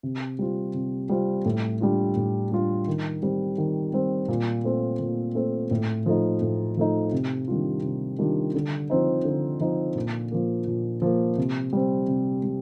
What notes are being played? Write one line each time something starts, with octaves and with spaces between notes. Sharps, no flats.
C3
G3 C4 F4
C3
G3 C4 F4
A2
G3 D4 F4
A2
G3 D4 F4
D#3
G3 C4
D#3
G3 C4
A#2
A3 C4 F4
A#2
A3 C4 F4
A2
F3 A3 D#4
A2
F3 A3 D#4
C3
D#3 G3 D4 F4
C3
D#3 G3 D4 F4
D3
F3 C4 D#4
D3
F3 C4 D#4
A#2
F3 A#3
A#2
F3 A#3
C3
G3 C4
C3
G3